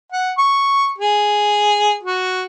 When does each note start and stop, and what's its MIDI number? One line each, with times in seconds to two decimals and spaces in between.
0.12 0.32 78
0.38 0.91 85
0.98 1.98 68
2.03 2.45 66